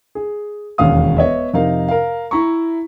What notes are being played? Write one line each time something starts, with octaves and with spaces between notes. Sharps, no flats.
G#4
E1 D#2 C#4 F5 D#6
B3 C#5 D#5 E5
F2 C3 D#4 A#4 F5
A#4 F5
E4 E5 A#5 C#6